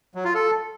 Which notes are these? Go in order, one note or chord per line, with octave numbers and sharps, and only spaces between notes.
F#3
F4
A4